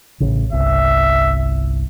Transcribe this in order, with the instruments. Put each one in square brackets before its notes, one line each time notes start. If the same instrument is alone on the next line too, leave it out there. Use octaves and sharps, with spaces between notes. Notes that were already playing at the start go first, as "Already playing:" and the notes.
[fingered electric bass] A1 C#3
[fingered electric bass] G1 C2 [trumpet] E5